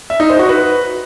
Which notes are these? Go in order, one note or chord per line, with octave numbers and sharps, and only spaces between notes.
E5
D#4
C5
F#4
B4